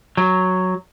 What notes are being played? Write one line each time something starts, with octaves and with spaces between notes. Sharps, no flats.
F#3